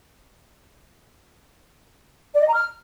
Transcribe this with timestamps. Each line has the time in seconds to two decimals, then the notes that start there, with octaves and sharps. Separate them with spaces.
2.35 D5
2.41 D#5
2.47 A#5
2.53 F6